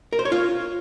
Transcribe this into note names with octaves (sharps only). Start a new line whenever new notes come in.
A#4
C5
C#5
F4